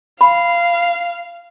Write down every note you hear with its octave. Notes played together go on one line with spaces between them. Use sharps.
F5 B5